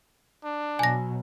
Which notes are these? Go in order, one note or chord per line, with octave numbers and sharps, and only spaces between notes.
D4
B2 F#3 G#5 A#6